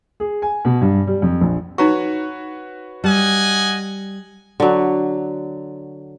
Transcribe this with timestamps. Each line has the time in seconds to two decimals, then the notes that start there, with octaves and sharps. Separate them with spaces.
0.20 G#4
0.42 G#5
0.65 B2
0.81 G2
1.07 G3
1.22 F2
1.41 A#1
1.78 D#4 F#4 B4 C#5 A#5 C#6
3.04 G3 D#5 F#5 G#5
4.60 D3 F#3